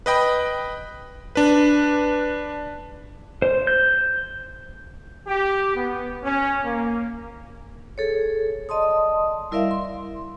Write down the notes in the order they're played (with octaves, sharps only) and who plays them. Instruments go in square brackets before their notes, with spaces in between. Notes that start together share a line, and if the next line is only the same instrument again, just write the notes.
[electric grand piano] B4 D#5 G5 B5
D4 B4
[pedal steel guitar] C5
G6
[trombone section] G4
B3
C#4
A#3
[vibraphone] G#4 A4 C#5
D5 D#5 A5 C6 D#6
G3 E4 A#4 D5 E5 F5
C6